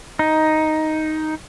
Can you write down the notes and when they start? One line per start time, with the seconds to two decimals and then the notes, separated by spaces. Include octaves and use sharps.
0.19 D#4